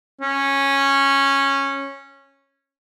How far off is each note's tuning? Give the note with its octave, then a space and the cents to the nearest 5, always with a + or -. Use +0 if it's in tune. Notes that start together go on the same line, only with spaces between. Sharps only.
C#4 -10